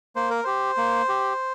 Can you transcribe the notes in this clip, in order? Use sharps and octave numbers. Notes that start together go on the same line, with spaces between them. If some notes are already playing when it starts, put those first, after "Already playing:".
A#3 C5
A#4
G4 C5
A#3
G4